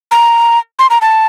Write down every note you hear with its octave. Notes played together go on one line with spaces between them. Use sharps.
A#5
C6
A#5
A5